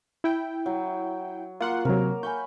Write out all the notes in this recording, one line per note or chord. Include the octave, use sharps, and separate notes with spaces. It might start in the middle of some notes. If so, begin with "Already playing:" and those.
E4 G5
F#3
A#3 F4 F#5 C6
C3 F#3 A#4
G#5 B5 C#6 G6